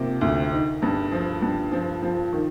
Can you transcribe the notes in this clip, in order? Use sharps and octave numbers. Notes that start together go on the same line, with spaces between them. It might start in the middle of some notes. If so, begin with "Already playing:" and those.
Already playing: C3 F3 A#3
D2
D#4
G2
F3
G2
F3
F3
D#3